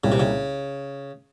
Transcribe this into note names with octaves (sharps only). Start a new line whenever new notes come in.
C2 A#2 C#3 G3
C3
C#3